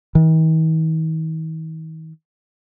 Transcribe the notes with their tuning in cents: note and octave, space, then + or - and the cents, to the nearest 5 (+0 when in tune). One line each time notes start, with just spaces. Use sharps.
D#3 +45